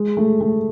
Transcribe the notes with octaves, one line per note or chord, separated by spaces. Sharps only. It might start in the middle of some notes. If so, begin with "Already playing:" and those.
Already playing: G#3
A3
A3